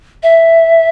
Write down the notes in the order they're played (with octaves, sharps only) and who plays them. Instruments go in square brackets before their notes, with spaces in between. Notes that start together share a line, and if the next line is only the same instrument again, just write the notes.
[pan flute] E5